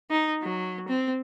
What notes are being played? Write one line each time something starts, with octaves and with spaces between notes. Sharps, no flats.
D#4
F#3
C4